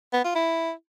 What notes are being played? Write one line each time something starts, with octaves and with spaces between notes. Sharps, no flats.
B3
F4
E4